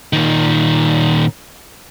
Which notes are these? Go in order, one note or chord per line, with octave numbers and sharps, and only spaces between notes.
A#2 D#3